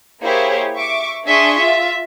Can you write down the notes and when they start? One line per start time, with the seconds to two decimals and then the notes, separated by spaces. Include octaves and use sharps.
0.23 A#3 E4 G4 G#4 C5 C#5
0.75 E5 C#6 D6
1.26 D4 G#4 E5 C6 C#6 D#6
1.57 F4 E5